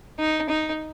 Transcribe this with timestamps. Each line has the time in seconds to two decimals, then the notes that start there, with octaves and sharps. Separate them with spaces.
0.19 D#4
0.49 D#4